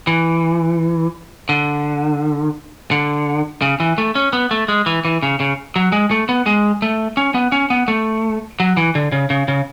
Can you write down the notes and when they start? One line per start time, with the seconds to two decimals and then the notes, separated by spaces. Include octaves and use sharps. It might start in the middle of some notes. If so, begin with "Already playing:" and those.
0.07 E3
1.49 D3
2.91 D3
3.62 C#3
3.80 E3
3.98 A3
4.15 C#4
4.33 B3
4.51 A3
4.68 G#3
4.86 E3
5.05 E3
5.23 C#3
5.40 C#3
5.76 F#3
5.92 G#3
6.11 A3
6.29 B3
6.46 G#3
6.82 A3
7.17 C#4
7.35 B3
7.52 C#4
7.70 B3
7.88 A3
8.60 F#3
8.77 E3
8.95 D3
9.12 C#3
9.30 C#3
9.48 C#3